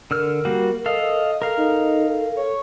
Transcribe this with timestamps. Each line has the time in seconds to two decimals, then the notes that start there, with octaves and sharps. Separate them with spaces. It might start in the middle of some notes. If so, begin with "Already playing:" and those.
0.11 D3 A#4 E6 F6
0.45 G3 A#3 F#4
0.86 A4 D#5 F5
1.42 A4 A#4 F5
1.57 D#4 A4
2.36 C#5